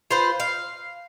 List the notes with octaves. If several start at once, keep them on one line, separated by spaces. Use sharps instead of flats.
F4 B4 C5
F5